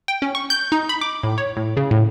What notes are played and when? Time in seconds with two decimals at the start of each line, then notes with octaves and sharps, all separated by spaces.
0.08 G5
0.22 C#4
0.35 C#6
0.50 G6
0.72 D#4
0.89 B5
1.01 D6
1.23 A2
1.38 C#5
1.57 A2
1.77 C#3
1.91 A2